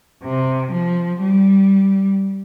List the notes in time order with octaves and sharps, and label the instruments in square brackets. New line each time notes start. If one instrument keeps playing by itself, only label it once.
[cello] C3
F3
G3